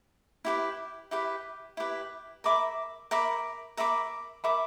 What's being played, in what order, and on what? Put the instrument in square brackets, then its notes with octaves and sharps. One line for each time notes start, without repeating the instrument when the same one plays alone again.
[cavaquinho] E4 G4 B4
E4 G4 B4
E4 G4 B4
A#4 E5 B5 D6
A#4 E5 B5 D6
A#4 E5 B5 D6
A#4 E5 B5 D6